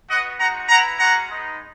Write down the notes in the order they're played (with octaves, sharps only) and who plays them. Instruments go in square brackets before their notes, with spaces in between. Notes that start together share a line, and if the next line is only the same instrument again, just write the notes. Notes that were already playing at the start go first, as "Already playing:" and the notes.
[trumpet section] B3 F#4 D#5 F#5
G#3 D#4 F#4 F#5 A#5
B3 E4 F#5 A#5
G#3 C#4 F#4 F#5 A#5
G#3 B3 D#4